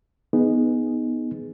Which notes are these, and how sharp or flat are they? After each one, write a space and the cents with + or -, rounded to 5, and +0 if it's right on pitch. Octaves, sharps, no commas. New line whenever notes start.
B3 +0 D#4 +0 G#4 +0